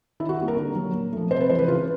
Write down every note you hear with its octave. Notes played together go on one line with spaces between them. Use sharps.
D#3 E4
F#4
G3 A#3
A#4
D3
F#3 A#3
A#2
F3 A3
C3 C5
B4
E3 G#3 C5
B4
C#3 F4